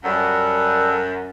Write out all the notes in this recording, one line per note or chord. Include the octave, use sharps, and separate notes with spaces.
F#2 G3 A4 F#5